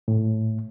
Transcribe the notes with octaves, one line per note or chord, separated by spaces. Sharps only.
A2